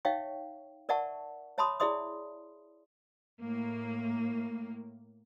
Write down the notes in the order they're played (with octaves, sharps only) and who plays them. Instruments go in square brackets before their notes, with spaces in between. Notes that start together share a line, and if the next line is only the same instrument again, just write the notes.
[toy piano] D#4 C#5 E5 F5 G5 C#6
A#4 D5 E5 F#5 A5 C#6
C#5 E5 A5 B5 C6 D#6
E4 G#4 D5 E5 C6 D#6
[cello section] A2 A#3